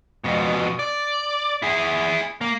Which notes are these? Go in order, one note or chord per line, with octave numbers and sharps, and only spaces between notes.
F2 B2
D5
E4 G#4
A#3